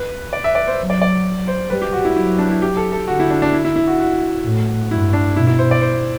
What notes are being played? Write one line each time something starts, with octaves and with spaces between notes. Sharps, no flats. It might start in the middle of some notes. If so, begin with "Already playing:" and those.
Already playing: B4
D5
E5
D5
C5
F#3
D5
D5
C5
G3 B4
G4
F#4
E4
F#3 E4
D4
E4
G4
A4
A4
D3 F#4
E4
D4
D4
E4
E4
E4
F#4
F#4
A2
G2 E4
D4
B2 E4
E4
C5
D5
C5